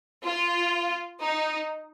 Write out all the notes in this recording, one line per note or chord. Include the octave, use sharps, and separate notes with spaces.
F4
D#4